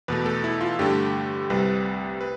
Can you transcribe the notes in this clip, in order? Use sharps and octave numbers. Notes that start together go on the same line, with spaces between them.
E2 B2 A3 B4
A4
E4
F4
G2 D3 A3 G4
C2 C3 G3 B4
B4